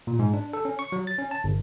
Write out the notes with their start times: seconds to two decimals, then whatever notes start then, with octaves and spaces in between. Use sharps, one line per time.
0.07 A#2
0.19 G#2
0.34 D4
0.53 A4
0.65 C#4
0.79 C#6
0.92 F#3
1.07 A6
1.18 C#4
1.31 A5
1.44 G1